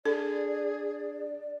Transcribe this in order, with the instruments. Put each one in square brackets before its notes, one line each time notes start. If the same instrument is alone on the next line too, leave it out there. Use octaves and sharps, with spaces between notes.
[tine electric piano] D4 [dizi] G#4 [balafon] A4 [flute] D5